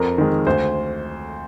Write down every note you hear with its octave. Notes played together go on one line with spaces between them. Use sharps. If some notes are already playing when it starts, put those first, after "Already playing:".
Already playing: F2 A#4
D#3 G#3
D2 C5